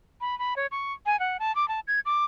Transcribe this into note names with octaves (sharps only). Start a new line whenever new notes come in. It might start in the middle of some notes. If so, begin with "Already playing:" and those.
B5
B5
C#5
C#6
G#5
F#5
A5
D6
A5
G#6
D6